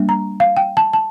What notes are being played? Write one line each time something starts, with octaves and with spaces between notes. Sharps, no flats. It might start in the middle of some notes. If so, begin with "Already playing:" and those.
Already playing: G3 A#3 D4
A#5
F5
G5
A5
A5